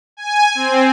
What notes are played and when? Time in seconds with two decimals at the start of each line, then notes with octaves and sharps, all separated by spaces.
0.17 G#5
0.55 C4